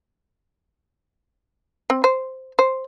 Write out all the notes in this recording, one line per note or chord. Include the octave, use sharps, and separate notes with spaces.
C4
C5
C5